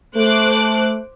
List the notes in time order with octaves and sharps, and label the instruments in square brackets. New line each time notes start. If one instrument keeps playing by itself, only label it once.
[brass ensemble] A3 [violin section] C5 D6 F#6